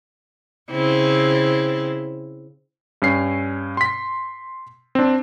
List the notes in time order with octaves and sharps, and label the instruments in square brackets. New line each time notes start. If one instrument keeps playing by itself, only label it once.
[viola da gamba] C#3 C4 E4
[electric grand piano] G2 C#4 C7
C6 B6
C4 D4